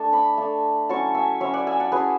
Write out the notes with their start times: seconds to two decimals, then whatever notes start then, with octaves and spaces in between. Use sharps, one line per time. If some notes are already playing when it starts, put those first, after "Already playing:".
Already playing: A3 D4 A5
0.13 B5 D6
0.38 A3 D4
0.89 F#3 C#4 E4 A5 C#6
1.15 E5 G#5
1.40 F#3 C#4 E4 C#5 E5
1.54 D5 F#5
1.67 E5 G#5
1.80 F#5 A5
1.92 F#3 C#4 E4 G#4 B4